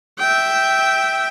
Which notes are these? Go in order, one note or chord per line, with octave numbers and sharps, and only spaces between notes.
E5 G5